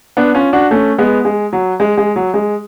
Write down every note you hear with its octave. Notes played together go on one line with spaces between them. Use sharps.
B3 D4
C#4 F4
D4 F#4
A3 C#4
G#3 B3
G#3
F#3
G#3
G#3
F#3
G#3